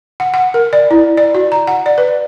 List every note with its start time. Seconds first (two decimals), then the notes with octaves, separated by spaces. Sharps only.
0.20 F#5
0.34 F#5
0.54 A#4
0.73 D5
0.91 E4
1.17 D5
1.34 F#4
1.52 A#5
1.67 F#5
1.86 D5
1.98 B4